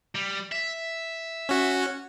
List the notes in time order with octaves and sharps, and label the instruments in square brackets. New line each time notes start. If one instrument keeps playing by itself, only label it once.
[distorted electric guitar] G3
E5
[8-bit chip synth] C#4 F#4